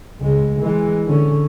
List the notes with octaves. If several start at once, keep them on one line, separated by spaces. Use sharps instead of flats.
C#2 G#3
E3 G#3
D3 C#4